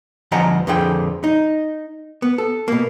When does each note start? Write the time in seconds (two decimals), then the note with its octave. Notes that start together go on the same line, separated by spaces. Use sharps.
0.32 D2 F3 D#5 F#5 G#5 A#5
0.67 F2 D3 F3 G#4 G5
1.24 D#4
2.22 B3
2.38 A4
2.68 B2 A#3